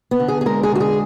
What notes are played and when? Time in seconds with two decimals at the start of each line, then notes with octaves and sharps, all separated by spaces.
0.11 B3
0.20 D3
0.28 G#4
0.41 G#4
0.46 G#3 A#4
0.63 G#4
0.72 D3 F#4
0.80 G#4